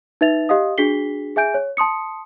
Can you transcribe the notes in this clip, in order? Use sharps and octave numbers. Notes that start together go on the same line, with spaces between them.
D#4 B4 E5 A6 F7
G4 D#5 F5 D#6
D4 F#4 G#4 B6 C7 G7
G#4 E5 G#5 G6 D7
C#5
A5 C6 D#6 C#7